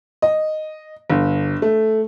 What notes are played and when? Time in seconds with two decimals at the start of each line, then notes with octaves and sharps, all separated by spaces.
0.22 D#5
1.10 G1
1.62 A3